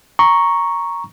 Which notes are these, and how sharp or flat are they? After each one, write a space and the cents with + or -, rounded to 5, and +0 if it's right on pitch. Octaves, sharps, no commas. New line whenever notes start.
A#5 +0 C#6 +0